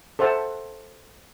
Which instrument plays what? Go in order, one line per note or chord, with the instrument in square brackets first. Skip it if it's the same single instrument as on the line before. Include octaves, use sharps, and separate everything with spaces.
[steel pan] A4 C5 E5 F#5 A5